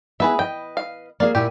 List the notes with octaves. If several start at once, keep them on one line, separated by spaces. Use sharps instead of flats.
B3 E4 G#4 B4 E5
B4 D#5 G5
F5
A#3 G#4 D5 F5
A#2 E4 G4 G#5